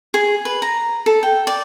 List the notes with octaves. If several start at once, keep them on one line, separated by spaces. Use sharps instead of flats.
G#4
B4
A#5
A4
G5
D5